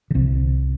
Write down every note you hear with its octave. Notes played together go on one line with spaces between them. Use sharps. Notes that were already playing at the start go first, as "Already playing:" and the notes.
D3
C2 C3